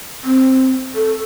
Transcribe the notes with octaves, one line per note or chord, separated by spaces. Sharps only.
C4
A4